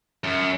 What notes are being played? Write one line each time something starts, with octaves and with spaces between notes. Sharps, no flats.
F#2